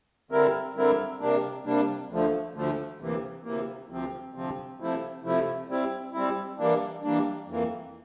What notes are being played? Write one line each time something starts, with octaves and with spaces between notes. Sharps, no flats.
D3 G3 C4 E4 A#4
D3 G3 C4 E4 A#4
C3 G3 A#3 D4
C3 G3 A#3 D4
D2 D3 F3 A3
D2 D3 F3 A3
D2 C3 E3 A#3
D2 C3 E3 A#3
D2 C3 F3 C4
D2 C3 F3 C4
C3 F3 A3 E4
C3 F3 A3 E4
G3 C4 E4
G3 C4 E4
E3 G3 A#3 D4
E3 G3 A#3 D4
F2 E3 A#3